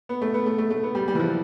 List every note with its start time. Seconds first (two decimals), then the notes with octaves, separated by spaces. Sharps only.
0.09 B3
0.22 A3
0.34 B3
0.46 A3
0.58 A3
0.70 A3
0.83 B3
0.95 G3
1.08 G3
1.15 E3
1.20 F3